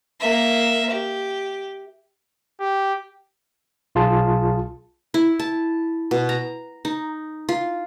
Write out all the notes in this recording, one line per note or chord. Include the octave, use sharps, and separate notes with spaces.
A#3 E5
G4
G4
B1 F4 G#4 A5
E4
A5
B2
A#5
D#4
F4